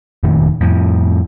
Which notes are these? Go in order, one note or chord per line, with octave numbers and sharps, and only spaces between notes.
F1 A#2 D#3 A3
F2 A2